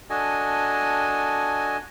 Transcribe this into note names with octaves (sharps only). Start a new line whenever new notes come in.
D4 F#4 A4 D#5 G#5